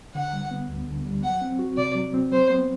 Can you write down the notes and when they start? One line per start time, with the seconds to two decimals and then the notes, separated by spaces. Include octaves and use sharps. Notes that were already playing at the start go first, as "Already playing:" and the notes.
0.15 D3 F#5
0.33 G3
0.51 B3
0.69 D2
0.87 D3
1.05 G3
1.23 F#3 F#5
1.41 C4
1.59 F#4
1.77 C3 D5
1.95 F#3
2.14 C4
2.31 F#3 C5
2.50 B3